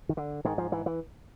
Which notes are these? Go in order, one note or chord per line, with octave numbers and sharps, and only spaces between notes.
D#3
D3
G#2 D#3
F3
E3
E3